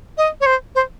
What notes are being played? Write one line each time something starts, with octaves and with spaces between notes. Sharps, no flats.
D#5
C#5
C5
C5